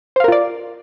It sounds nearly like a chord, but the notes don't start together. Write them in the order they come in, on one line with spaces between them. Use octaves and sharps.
C5 F5 A#4 F4 D5